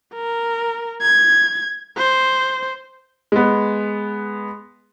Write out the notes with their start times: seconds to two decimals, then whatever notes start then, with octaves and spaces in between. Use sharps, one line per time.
0.14 A#4
1.02 G#6
1.97 C5
3.32 G#3 B3